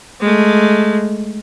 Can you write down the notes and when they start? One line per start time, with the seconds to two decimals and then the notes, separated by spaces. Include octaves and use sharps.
0.21 G#3 A3